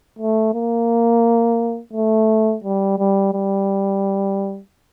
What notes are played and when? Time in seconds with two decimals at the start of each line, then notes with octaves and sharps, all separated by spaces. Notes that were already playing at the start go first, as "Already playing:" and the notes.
0.19 A3
0.54 A#3
1.93 A3
2.64 G3
2.99 G3
3.34 G3